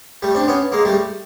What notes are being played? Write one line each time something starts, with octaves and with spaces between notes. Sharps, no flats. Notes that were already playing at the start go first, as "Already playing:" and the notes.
G3 A3
C4 D4
B3 C#4
G#3 A#3
G3 A3